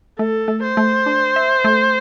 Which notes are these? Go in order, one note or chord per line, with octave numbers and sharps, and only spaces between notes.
A3 A4
A3
C5
A3
D4
E5
A3